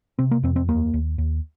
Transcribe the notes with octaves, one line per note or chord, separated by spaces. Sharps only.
C3 C4
A#3
F2 C4
C4
D#2 A#3
D#2
D#2